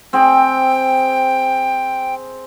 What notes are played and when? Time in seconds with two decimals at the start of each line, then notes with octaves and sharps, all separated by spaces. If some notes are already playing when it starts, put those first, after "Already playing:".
0.13 C4 G#4 G5